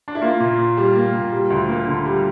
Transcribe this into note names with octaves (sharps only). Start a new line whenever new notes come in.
D4
E4
A#3 F4
A#2
A#2
G3
A#3
A#2
G3
D2
A#3
D3
G3